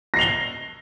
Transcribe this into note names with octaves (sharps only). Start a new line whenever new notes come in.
A#6 C7 F7 G7